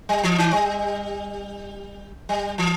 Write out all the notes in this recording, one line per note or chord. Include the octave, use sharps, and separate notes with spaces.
G3
E3
D#3
G3
G3
E3